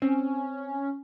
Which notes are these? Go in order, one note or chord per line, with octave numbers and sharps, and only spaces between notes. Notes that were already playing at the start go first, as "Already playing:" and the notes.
C4 C#4